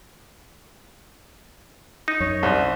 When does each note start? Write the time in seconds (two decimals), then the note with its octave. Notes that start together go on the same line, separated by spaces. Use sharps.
2.08 D#4
2.20 F#2 C#5
2.43 C2 C5